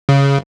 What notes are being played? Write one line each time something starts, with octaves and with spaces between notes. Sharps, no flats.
C#3